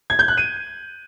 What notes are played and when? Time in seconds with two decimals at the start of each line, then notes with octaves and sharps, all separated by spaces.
0.10 G#6
0.19 G6
0.28 F#6
0.37 D#7